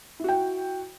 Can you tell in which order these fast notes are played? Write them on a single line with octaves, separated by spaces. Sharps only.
E4 F#4 G5